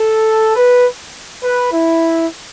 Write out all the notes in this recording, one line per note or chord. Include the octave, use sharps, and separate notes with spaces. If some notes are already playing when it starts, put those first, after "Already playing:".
Already playing: A4
B4
B4
E4